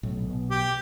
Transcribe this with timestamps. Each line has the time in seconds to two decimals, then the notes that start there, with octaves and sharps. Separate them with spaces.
0.03 B1 A2
0.28 B2
0.51 G4